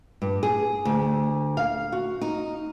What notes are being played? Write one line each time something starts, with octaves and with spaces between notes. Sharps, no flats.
G2
G#4
D2
F5
F#4
D#4